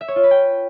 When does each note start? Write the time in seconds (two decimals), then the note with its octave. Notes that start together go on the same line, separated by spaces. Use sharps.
0.01 E5
0.08 C#5
0.16 F4
0.23 B4
0.31 G5